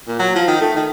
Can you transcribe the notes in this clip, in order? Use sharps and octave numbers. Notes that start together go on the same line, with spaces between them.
A#2
F#3
F3
D#3
A3
D#3